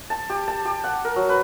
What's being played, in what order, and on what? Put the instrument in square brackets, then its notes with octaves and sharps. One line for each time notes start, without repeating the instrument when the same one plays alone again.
[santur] A5
G4
A5
G4
F#5
A#4
F#3
B4